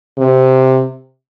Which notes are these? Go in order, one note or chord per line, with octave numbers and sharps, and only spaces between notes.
C3